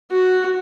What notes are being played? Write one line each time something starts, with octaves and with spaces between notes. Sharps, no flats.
F#4